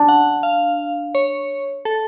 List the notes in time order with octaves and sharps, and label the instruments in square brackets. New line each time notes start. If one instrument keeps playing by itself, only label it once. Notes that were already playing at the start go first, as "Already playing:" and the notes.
Already playing: [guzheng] D4
[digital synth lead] F#5
F5
C#5
A4